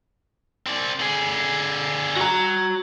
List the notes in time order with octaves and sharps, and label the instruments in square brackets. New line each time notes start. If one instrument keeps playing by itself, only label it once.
[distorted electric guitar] C4 D5
D3 G#4
[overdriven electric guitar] F#4 A#5